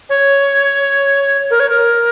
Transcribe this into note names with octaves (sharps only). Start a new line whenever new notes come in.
C#5
A#4
C#5
A#4